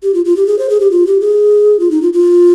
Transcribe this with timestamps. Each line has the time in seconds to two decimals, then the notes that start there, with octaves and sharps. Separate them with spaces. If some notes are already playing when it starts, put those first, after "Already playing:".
0.03 G4
0.14 F4
0.25 F4
0.36 G4
0.47 G#4
0.59 C5
0.70 G#4
0.80 G4
0.91 F4
1.07 G4
1.21 G#4
1.80 F4
1.91 D#4
2.02 F4
2.13 F4